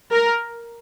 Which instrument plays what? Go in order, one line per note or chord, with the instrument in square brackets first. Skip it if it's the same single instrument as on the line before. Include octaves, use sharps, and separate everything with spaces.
[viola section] A#4